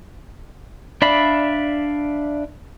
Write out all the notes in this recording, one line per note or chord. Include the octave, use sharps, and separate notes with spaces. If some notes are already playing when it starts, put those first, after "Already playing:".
D4 D5 E5 F5 B5